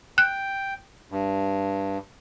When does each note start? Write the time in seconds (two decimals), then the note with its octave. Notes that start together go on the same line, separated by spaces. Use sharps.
0.18 G5 F#6
1.11 G2